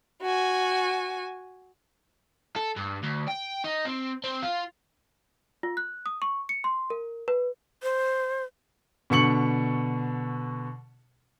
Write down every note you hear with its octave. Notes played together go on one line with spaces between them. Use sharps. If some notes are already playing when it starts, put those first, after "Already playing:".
F#4 G#5
A4
G2
D2
G5
D#4
C4
C4
F4
F4
F#6
D#6
C#6
C#7
C6
A#4
B4
C5
B2 D3 C#6 C#7 F#7